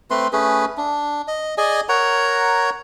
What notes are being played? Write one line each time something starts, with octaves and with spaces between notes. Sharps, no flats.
A3 C4 B4 C6
A3 C#4 G#4 B4
D4
D#5
G#4 D5 D#5 G#5
A#4 C#5 F#5 A#5